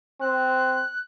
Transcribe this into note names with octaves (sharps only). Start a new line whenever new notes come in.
C4 F#6